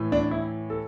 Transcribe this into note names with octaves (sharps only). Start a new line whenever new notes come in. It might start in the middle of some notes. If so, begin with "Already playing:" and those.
Already playing: A2 E3
D4
E4
A4